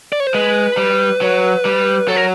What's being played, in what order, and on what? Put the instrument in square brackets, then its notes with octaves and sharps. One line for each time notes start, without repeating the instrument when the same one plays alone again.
[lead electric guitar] D5
C#5
C5
[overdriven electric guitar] G#3 [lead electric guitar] B4
[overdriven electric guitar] G3
F#3
G3
[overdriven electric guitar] F#3 [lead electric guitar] A4
[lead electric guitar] A#4